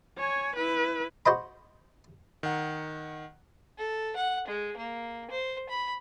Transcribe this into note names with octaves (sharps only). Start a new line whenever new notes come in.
C#5 G#5
E4 B4
F#4 C5 D#5 B5
D#3 F#5
A4
F#5
G#3
A#3
C5
B5